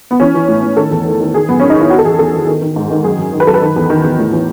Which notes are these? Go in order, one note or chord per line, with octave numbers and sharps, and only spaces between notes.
B3
E3 C#4
E3
A2
A2
D#3 A4
E2
D#3
D#3
D#3 G#4
F#2 B3
D#3 C#4
D#4
D#3 E4
D#3 F#4
A4
E2 G#4
E2 A4
D#3
D#3
D#3
G#2
D#3
F#2 G#4
F#2
D#3
B4
F#2 A4
B4
D#3
E2
D#3
E2
A2
E3